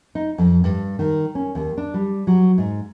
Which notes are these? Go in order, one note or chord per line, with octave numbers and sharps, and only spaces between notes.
D#4
F2
G2
D#3
C#4
D#2
D4
G3
F#3
G#2